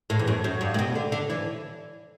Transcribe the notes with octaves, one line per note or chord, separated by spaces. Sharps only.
A2
E2
F#2
F#2
G2
A2
B2
D3
D3
E3